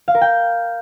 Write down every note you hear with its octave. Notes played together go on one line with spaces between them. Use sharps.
F5
A#4
G5